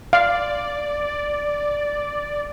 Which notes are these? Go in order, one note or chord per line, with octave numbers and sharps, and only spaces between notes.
D5 F5